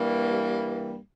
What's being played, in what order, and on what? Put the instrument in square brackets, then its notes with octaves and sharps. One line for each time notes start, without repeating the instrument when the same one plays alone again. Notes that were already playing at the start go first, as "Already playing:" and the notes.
Already playing: [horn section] G2 E3 G3 A#3